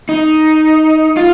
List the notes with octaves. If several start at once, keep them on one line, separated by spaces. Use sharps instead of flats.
D#4
F4